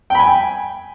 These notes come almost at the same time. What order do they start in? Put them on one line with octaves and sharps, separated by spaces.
G5 B5 G#5